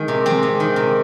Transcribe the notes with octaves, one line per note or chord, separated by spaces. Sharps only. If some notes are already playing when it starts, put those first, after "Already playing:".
Already playing: D#3 G#3
C3
G#3 C4
C3
D#3
C3